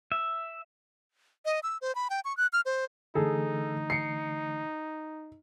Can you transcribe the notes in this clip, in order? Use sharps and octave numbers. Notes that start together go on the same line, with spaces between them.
E5
D#5
E6
C5
B5
G5
C#6
F#6
F6
C5
D3 E3 A3 D#4 G#4 A4
C7 C#7